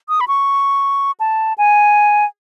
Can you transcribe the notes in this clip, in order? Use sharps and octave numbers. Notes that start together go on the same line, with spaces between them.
D#6
B5
C#6
A5
G#5